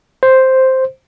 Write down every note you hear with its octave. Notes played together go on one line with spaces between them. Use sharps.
C5